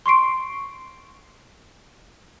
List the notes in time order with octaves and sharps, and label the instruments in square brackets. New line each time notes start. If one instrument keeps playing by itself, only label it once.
[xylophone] C6 C#6 C7 D7